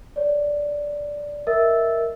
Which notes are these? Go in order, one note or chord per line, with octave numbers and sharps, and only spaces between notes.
C#5 D5
A#4 D#5 E5 E6 A6